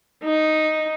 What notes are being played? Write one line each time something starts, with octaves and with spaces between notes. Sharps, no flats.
D#4